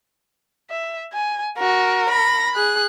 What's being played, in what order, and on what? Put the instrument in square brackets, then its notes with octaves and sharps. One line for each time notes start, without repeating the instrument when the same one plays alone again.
[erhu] E5
G#5
[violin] F#4 [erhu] A#4
[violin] B5 A#6
[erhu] G#4 [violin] F#6